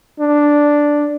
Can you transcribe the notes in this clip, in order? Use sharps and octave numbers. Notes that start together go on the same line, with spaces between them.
D4